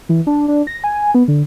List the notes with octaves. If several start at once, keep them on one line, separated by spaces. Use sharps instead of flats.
E3
D4
D4
A#6
G#5
B3
D3